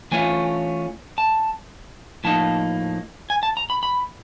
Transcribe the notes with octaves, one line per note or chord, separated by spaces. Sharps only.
E3 A3 C#4 F4 G#5
A5
A2 F3 A#3 D#4 A5
G#5
A5
A#5
B5
B5